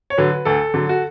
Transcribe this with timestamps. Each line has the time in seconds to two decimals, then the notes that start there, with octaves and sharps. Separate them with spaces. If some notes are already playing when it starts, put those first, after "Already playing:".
0.10 C#5
0.18 D3 F#3 B4
0.45 D2 A4
0.74 D3 F#3
0.89 F#4